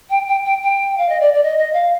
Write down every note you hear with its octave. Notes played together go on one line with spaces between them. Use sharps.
G5
G5
G5
G5
F5
D#5
D5
D5
D#5
D#5
F5